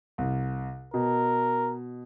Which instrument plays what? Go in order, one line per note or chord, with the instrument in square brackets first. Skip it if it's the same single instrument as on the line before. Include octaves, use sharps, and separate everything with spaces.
[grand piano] C2
[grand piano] B2 [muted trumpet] A#4